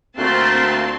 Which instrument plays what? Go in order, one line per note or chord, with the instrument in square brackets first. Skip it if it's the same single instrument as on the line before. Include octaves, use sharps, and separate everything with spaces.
[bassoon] D2 [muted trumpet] A3 [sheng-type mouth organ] A#3 F4 F#6 [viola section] C4 A5 C6